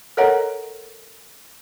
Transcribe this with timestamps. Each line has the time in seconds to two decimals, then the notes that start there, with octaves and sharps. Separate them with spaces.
0.17 A4 A#4 C#5 D#5 F#5 A#5